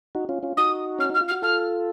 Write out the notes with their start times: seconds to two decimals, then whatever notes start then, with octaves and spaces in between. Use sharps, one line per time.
0.15 D#4 F#4
0.29 C#4 F4
0.43 C#4 F4
0.57 D#4 F#4 D#6
0.99 C#4 F6
1.10 D#4 F6
1.21 F4
1.28 F6
1.31 F#4
1.42 F4 A4 F6